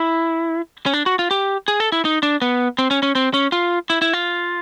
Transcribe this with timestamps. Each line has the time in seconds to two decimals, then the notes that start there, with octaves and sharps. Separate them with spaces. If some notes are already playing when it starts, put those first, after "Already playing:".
Already playing: E4
0.86 C#4
0.94 D4
1.06 F#4
1.19 F4
1.31 G4
1.68 G#4
1.80 A4
1.92 E4
2.05 D#4
2.23 D4
2.42 B3
2.78 C4
2.91 C#4
3.03 C#4
3.15 C4
3.34 C#4
3.52 F4
3.90 E4
4.02 E4
4.13 F4